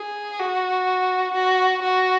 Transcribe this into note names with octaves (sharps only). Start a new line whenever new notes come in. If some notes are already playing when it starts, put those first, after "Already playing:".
Already playing: G#4
F#4
F#4
F#4